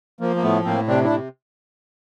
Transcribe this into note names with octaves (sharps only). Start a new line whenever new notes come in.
F3 A#3
A#3
A2 A3 B3
A2 A#3 C4
C3 C4 D4
D4 E4
C3